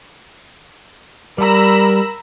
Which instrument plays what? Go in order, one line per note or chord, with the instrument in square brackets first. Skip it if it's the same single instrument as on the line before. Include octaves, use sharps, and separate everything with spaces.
[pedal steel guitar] G3 [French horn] A#4 [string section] A#5 B5 E6